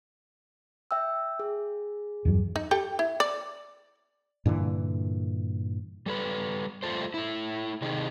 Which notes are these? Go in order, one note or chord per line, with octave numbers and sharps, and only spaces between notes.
E5 G5 E6
G#4
E2 G2 F#3
D#4
G4 A4 G5
E4
D5
G2 A#2 D3 E3
G3 A4 B4
G3 A3 F4 G4 A4 C5
A3 E4
C3 D#3 D#4 G4 G#4